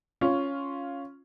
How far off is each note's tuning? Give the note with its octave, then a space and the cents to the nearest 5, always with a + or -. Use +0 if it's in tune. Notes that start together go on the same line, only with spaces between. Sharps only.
C#4 +0 F4 +0